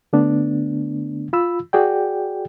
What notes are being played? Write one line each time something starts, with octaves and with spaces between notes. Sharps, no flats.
D3 A3 B3 D4
F4 B5 E6
F#4 G#4 D5 G5